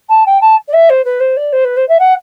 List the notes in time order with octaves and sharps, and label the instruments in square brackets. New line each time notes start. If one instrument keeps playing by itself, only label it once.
[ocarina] A5
G5
A5
D5
E5
C5
B4
C5
D5
C5
B4
C5
E5
F#5